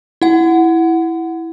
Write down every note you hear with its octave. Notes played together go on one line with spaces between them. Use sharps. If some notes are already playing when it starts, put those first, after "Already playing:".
E4 F#5